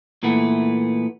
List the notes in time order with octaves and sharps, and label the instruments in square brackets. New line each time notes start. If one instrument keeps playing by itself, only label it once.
[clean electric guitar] A#2 E3 A3 B3